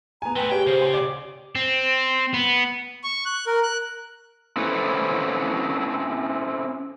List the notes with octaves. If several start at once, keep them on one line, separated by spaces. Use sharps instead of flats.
B3 G#5 A#5
A3 C4 B4 G5
G4 G#4 C#5 G5
C#3 C5
G5 G#5 C6
C#5 D5 D6
C4
B3
C#6
F#6
A#4
F#6
C4 C#4 E4 A4 B4 C#5